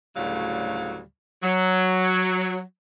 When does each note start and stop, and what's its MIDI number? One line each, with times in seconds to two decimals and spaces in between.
0.15 1.00 38
0.15 1.00 45
0.15 1.00 49
0.15 1.00 54
0.15 1.00 55
0.15 1.00 77
1.43 2.60 54